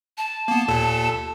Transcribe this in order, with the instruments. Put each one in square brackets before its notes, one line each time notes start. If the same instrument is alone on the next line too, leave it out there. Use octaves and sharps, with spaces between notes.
[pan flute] A5
[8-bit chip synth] A#3 B3
D#2 A#2 A4